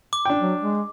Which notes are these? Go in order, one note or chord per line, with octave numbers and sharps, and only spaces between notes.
D6
D4 G5
F#3
G#3